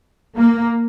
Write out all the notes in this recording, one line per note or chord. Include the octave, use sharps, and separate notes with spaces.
A#3